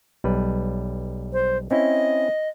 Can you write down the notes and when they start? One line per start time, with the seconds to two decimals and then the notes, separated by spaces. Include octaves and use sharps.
0.24 B1 G3 B4
1.33 C5
1.71 C4 C#4 E4 D#5